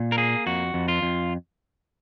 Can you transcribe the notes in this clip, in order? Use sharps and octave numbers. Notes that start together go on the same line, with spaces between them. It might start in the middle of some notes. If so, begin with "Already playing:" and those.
Already playing: A#2
A#4
A#3 G#4
F2 F#4
F2
F4
F2